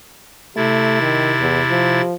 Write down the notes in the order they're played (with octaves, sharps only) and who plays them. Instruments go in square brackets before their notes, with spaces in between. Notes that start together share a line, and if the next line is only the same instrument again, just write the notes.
[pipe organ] C3 E4 A6 [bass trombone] A3
[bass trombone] D#3
E2
F3